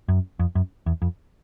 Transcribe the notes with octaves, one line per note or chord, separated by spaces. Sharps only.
F#2
F2
F#2
E2
F2